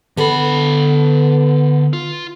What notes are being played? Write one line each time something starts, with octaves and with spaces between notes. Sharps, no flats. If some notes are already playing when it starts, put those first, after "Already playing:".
D3 B3 A4 B5
F4